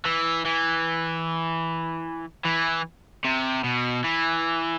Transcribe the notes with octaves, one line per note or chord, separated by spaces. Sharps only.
E3
E3
E3
C3
B2
E3